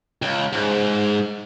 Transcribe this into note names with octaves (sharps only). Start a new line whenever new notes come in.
C#2
G#2